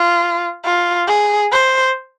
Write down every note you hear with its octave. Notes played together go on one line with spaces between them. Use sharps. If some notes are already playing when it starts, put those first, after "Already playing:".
Already playing: F4
F4
G#4
C5